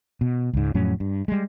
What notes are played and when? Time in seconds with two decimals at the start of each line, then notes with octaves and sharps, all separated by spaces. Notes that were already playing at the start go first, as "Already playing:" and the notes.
0.21 B2
0.53 C#2 G#2
0.74 F2 A2 F#3 C#4
1.00 G2
1.28 G3 G#3